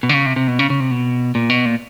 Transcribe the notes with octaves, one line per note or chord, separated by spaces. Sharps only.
B2
D3
C#3
C3
C3
B2
C#3
C#3
C3
B2
A#2
B2
A#2